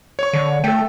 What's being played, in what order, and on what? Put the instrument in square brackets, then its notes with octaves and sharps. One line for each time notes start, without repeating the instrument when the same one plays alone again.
[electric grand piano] C#5 C#6
[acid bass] D3
[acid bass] A3 [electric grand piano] A4 G5